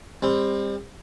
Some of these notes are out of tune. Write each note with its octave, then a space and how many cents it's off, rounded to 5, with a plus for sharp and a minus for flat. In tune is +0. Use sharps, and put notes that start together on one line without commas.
G3 +35 C4 +15